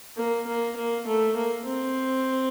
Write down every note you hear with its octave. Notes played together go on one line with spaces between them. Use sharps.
A#3
A#3
A#3
A3
A#3
C4